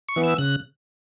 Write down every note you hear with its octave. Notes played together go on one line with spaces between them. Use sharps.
C#6
E3 B3
E6
C#3 F#6